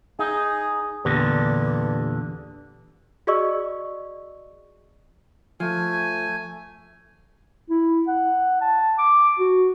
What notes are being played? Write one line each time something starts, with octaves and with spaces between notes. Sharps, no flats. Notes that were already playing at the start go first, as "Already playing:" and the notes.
D#4 G#4
E2 G2 A#2 D3
F#4 G#4 D5 D#5 C#6 E6
F3 A3 G#5
E4
F#5
A5
D6
F#4